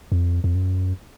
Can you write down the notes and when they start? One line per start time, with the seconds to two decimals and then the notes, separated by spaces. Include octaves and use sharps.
0.12 F2
0.44 F2
0.55 F#2